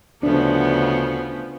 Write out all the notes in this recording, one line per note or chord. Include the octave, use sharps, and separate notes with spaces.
D2 C#3 F3 B3 D4